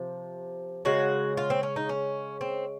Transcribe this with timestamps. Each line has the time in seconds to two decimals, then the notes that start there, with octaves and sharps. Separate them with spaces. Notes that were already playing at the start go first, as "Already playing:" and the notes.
Already playing: C3 F3
0.85 C#3 G#3 F#4
1.37 F4
1.50 C4
1.63 C#4
1.76 D#4
1.89 C#4
2.41 C4